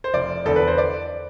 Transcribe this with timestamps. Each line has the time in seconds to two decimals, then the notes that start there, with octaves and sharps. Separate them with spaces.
0.04 C5
0.14 F1 D5
0.45 E2 D3 A4
0.56 B4
0.67 C5
0.78 D5